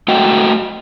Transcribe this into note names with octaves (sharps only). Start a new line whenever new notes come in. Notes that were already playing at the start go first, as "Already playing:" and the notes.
A3 F#4 D#5 G5